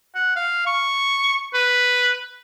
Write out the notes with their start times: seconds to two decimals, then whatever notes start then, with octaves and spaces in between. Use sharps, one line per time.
0.15 F#5
0.36 F5
0.66 C#6
1.54 B4